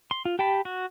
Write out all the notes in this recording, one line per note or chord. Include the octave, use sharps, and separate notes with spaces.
C6
F4
G4 G5 A5 B5
F#4